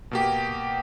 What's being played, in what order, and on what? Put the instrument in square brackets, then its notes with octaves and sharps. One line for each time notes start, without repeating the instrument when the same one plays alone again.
[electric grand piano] B2 A#3 G4